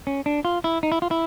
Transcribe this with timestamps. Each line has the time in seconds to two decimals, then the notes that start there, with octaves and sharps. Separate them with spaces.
0.07 C#4
0.26 D4
0.45 F4
0.64 E4
0.83 D#4
0.92 E4
1.02 F4
1.11 E4